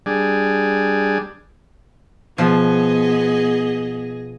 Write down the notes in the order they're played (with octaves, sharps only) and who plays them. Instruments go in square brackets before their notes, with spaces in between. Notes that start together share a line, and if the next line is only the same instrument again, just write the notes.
[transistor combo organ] G3 D4 G#4
[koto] B2 F3 [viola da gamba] B3 [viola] G#4 D#5